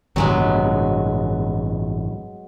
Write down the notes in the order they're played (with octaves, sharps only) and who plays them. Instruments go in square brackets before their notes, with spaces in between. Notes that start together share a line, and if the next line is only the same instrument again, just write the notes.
[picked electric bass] A1 G2 C3 [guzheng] F#3 G#3 B3